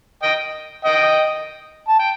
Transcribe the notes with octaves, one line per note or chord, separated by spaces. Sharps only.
D#5 G5
D#5 G5
A5
G5